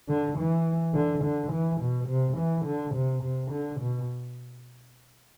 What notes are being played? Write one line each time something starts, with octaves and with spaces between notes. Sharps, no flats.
D3
E3
D3
D3
E3
B2
C3
E3
D3
C3
C3
D3
B2